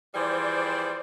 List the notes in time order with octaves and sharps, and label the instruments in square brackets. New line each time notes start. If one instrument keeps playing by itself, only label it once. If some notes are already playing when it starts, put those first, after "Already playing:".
[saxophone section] E3 F3 G3 [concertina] G#4 G5 [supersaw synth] C5 D5